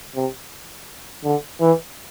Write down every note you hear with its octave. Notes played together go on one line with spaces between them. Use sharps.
C3
D3
E3